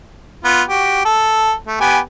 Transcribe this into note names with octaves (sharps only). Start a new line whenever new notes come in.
B3 F4
F#4 G4
A4
A3
B3 G4 G#5